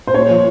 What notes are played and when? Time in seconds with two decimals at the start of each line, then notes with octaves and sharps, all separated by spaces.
0.07 C5
0.14 A#2 C#5
0.30 F3